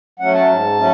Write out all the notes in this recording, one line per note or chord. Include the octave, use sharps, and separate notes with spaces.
F#3 A3 C#4 F#5
A5
G#2
F#3 A3 C#4